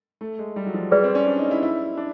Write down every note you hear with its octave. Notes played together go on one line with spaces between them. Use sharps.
A3
G#3
G3
F#3
F3
G3 G#4 B4 D5
C4
C#4
D4
D#4
E4
E4
D4